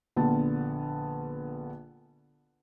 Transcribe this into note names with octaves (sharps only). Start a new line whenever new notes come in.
A#1 D3 B3 A5